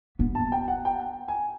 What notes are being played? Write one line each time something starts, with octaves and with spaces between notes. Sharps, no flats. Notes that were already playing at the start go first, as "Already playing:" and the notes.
B3
A5
G5
F#5
G5
G#5